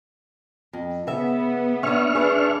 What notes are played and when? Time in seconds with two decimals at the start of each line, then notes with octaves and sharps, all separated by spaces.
0.73 F2
1.07 C#3 B3 E5
1.83 C#4 D4 E5 C#6 F6
2.15 D4 G#4 B4